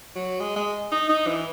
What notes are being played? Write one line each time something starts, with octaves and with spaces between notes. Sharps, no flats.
F#3
G#3
G#3
D#4
D#4
E3